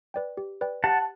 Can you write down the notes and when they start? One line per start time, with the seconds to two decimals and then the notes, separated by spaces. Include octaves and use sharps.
0.14 B4 D5 G5
0.37 G4
0.61 B4 D5 G5
0.84 G4 F#5 A5